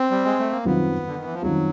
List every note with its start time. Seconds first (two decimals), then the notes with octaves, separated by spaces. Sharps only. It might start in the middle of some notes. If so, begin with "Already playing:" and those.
Already playing: C4
0.11 G3
0.25 G#3
0.39 A3
0.51 A#3
0.65 F#2 D#3 G3 B3 C4 F4
1.07 D3
1.16 D#3
1.25 E3
1.33 F3
1.42 F#2 D#3 F#3 G3 C4 F4